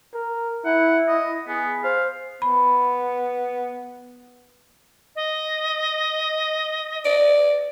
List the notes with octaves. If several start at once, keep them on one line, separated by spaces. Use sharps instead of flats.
A#4
E4 F#5
D#5
B3 G#4
C5 F5
B3 B5
D#5
D5